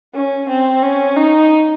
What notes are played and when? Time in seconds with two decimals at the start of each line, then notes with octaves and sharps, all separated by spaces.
0.14 C#4
0.49 C4
0.82 C#4
1.17 D#4